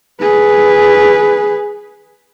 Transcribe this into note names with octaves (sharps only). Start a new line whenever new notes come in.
G#4 B4